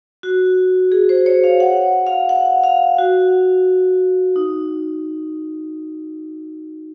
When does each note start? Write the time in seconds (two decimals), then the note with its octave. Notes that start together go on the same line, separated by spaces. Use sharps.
0.23 F#4
0.92 G#4
1.09 C5
1.26 C#5
1.44 F5
1.60 F#5
2.07 F5
2.29 F#5
2.64 F5
2.99 F#4
4.36 D#4